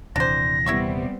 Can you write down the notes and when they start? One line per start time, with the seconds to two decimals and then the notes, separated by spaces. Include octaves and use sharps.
0.16 D#1 C3 E3 D4 C5 A#6
0.66 G3 B3 C4 E4 E5 C#6